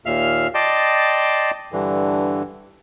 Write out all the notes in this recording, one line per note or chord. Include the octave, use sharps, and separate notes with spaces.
D#2 A#2 E5 F5 F6
D5 D#5 G5 A5 C6 D6
G2 D3 E3